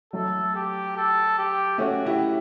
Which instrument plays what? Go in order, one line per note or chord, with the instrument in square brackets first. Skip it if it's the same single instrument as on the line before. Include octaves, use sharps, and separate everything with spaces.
[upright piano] F#3 A3 [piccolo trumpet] A4
[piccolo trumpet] G4
A4
G4
[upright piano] A3 C#4 [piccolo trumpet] F#4
[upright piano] E4 G4